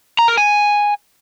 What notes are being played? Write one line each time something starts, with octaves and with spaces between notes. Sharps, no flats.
A#5
A#4
G#5